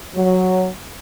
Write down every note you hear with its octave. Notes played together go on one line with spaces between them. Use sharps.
F#3